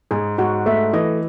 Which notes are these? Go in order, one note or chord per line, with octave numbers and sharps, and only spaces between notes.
G#2 G#4
G#2 F#4
A3 E5
E3 D#5